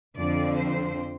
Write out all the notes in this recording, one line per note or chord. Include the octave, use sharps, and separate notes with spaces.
F2 D3 F3 C4 D5
C5